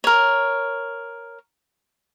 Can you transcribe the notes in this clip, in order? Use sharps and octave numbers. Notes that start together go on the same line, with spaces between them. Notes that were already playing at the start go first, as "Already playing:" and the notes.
A#4 C#5